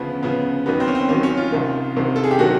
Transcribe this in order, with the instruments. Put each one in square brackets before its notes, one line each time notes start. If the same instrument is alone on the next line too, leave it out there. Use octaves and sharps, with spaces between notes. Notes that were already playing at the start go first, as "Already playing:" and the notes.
Already playing: [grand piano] D2 C#3 F3 B3
D2 C#3 F3 B3
D#2 D#3 F#3 B3
C4
C#4
C4
D#2 D#3 F#3 C#4
C#4
F4
C2 C3 D#3
C2 C3 D#3
A4
G#4
G4
C3 D#3 F#3 F#4